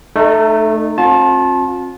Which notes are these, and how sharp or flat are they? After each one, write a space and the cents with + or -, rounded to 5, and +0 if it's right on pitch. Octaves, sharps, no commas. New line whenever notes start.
A3 -5 D#4 -30 A4 +30
C4 +35 F4 +40 A5 -20